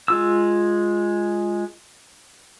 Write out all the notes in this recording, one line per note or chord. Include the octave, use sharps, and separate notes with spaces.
G#3 F4 E6